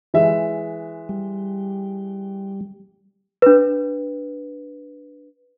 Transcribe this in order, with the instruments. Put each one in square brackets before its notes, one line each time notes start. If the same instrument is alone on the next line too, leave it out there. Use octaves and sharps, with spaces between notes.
[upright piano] E3 G#3 E5
[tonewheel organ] G3
[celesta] D4 B4